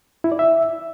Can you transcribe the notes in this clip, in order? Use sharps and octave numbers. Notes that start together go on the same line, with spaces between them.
E4
D5
E5